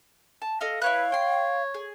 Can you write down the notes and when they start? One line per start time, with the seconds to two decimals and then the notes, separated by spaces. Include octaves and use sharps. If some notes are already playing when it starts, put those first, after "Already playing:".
0.42 A5
0.61 A4 D#5 F5
0.82 E4 B4 C#5 F5 F#6
1.12 C#5 G5 C6
1.74 G#4